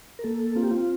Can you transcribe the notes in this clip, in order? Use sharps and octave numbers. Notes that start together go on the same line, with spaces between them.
A#4
A#3 A4
C4 F4
G4
F4